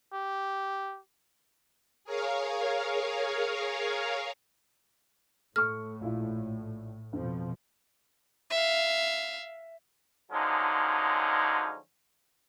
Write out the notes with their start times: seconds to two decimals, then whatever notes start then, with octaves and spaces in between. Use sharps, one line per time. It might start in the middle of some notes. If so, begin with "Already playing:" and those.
0.13 G4
2.04 G#4 A#4 C#5 F5
5.56 A2 A3 C#6 F6
6.01 A#1 E4 F4
7.13 F2 B2 F3
8.50 E5 F5
10.31 D3 F3 F#3 G#3 C#4 D#4